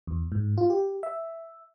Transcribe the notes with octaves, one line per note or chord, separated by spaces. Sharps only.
E2
G#2
F4
G4
E5